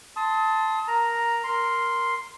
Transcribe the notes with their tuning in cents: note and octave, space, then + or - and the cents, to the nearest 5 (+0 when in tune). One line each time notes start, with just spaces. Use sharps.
A5 +0 C6 +0 D#6 +35
A#4 +5 A#5 +0
A#4 +0 C6 +0